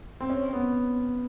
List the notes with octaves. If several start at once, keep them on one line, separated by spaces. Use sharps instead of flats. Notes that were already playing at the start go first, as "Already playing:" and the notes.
C4
C#4
B3